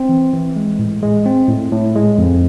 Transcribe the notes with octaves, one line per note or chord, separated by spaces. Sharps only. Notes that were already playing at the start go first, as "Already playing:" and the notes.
Already playing: C4
E3
E3
G#3
A2
G#3
C4
A2
A2
G#3
F2